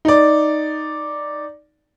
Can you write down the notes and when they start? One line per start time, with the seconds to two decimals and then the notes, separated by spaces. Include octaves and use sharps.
0.05 D#4 D5